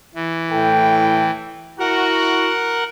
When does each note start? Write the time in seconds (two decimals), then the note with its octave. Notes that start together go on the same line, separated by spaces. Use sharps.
0.15 E3
0.52 A2 A4 G5
1.79 E4 F#4 A#4 F#5